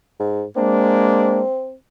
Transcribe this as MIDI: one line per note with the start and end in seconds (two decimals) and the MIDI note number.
0.20 0.45 44
0.56 1.41 56
0.56 1.41 58
0.56 1.74 60
0.56 1.41 62